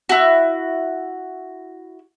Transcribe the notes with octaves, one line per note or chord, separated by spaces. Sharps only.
E4 F#4